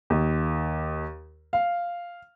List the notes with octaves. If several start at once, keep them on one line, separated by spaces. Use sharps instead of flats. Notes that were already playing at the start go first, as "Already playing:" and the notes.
D#2
F5